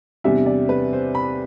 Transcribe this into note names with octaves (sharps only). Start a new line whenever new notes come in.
E2 C3 G3 D4 E5
D5
B4
C5
B5